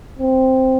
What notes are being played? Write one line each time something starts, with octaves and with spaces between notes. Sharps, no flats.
C4